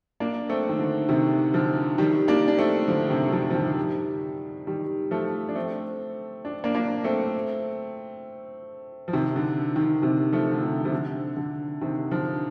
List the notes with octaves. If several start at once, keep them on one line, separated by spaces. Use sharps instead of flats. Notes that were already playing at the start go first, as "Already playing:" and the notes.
A#3 D4
A3 C4
D#3
D3
C3 D#3
D3 F3
D#3 G3
A#3 D4
D4
A3 C4
D3 F3
C3 D#3
D3 F3
F3
D#3 G3
D#3 G3
F3 A3
D4
A3 C4
D4
A#3 D4
A#3 D4
A3 C4
F3
C3 D#3
D3
D#3
D3
C3 D#3
F3 A3
D3
C3
C3
D3
D3
C3 D#3
D3 F3